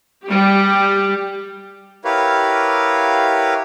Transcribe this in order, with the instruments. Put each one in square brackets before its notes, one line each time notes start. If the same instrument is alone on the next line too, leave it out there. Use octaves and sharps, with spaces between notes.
[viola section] G3 G4
[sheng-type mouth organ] E4 G4 A#4 B4 C#5 F5